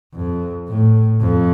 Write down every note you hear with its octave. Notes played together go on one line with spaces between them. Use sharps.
F2
A2
F2